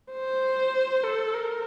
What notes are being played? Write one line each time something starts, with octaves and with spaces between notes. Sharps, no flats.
C5
A4
A#4